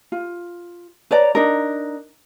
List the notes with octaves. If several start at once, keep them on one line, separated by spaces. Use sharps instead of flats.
F4
B4 C#5 D5 A#5
D4 D#4 A#4